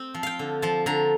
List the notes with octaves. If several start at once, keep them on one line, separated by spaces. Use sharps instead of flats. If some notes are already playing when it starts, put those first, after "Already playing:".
Already playing: C4 G5
F3
F5 G5
D3
F3 A5
D3 A#5